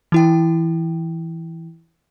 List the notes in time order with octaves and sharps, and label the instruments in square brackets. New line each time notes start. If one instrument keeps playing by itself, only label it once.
[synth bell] E3 E4 G5